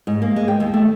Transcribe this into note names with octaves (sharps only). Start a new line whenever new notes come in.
G#2
A#3
G#3
G5
D#2
A3